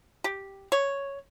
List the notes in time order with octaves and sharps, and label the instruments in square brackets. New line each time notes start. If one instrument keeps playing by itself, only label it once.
[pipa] G4
C#5